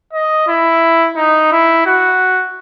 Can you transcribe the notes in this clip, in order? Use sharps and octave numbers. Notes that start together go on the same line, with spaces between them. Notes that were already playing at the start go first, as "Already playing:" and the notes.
D#5
E4
D#4
E4
F#4